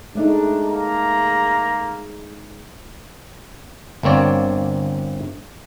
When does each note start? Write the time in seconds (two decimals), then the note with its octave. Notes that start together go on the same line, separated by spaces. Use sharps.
0.15 G#3 A3 D4 D#4
0.69 A#3 A#5
4.03 G1 A#3 C4 C#5 D5